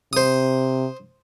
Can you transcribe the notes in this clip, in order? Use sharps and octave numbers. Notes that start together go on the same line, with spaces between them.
C3 C5 D#6